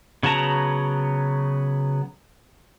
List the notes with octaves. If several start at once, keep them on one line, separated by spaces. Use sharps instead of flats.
C#3 F#3 B3 A5 A#5